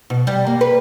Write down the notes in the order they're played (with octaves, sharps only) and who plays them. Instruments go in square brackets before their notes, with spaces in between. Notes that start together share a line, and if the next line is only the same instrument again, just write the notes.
[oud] B2
G3
A#3
B4